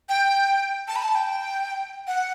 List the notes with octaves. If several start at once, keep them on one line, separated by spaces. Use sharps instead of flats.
G5
A5
B5
A5
G5
F#5